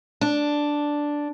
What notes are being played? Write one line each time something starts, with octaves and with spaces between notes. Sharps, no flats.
D4